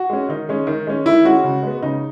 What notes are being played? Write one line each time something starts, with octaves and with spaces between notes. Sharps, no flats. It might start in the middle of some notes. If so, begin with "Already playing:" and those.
Already playing: F#4
G#3 C#4
D#3 D#4
G#3 C#4
D#3
G#3 C#4
D#3 E4
G#3 C#4 F#4
C#3
G#3 B3
C#3 D#4